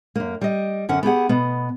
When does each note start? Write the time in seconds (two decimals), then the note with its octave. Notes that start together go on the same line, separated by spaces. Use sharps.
0.16 F#2 A#3
0.41 G3 D#5
0.89 F#2 D3 C#4 F#5
1.03 B3 G4 G#4 F#5
1.29 B2 B3